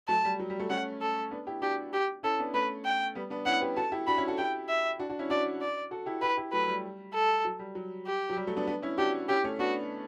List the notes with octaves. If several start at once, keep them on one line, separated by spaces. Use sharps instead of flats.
F#3 A3 A5
G3
F#3
G3
F#3 A3
A3 C#4 F#5
A4
B3 D4
E4 G4
D4 F#4 G4
G4
C#4 E4 A4
B3 D4
A3 C#4 B4
G5
G3 B3
B3 D4
C#4 E4 F#5
G4 B4
F#4 A4 A5
E4 G4
D4 F#4 B5
C#4 E4
F#4 A4
E4 G4 G5
E5
D4 F#4
D4 F#4
C#4 E4
D4 F#4 D5
D5
F#4 A4
E4 G4
E4 G4 B4
E4 G4
F#3 A3 B4
G3
A4
F#3
G3
F#3
G4
F#3
G3
F#3 A3
B3 D4
B3 D4
C#4 E4
D4 F#4 G4
C#4 E4 G4
A3 C#4
B3 D4 F#4